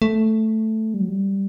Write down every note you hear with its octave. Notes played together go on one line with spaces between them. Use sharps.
A3
G3
F#3
G3